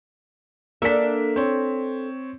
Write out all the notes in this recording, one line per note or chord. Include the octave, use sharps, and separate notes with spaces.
A#3 D4 A4 E5 B6
C4 C#5